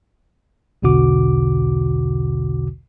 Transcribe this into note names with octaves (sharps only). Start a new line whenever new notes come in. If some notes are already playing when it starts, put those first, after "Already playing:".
B1 E2 B2 D3 F#4 D6